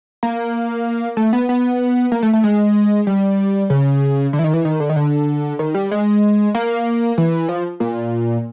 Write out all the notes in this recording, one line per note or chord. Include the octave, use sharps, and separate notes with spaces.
A#3
A3
B3
B3
A#3
A3
A3
G#3
G3
C#3
D3
E3
D#3
E3
D#3
D3
D#3
D3
D#3
G3
G#3
A#3
E3
F3
A#2